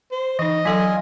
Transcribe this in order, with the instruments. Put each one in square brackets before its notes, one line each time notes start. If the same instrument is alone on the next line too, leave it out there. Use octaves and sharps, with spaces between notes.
[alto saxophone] C5
[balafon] E3 D#4 [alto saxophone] D#5
[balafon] F#3 A4 D5 [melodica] F4 G#5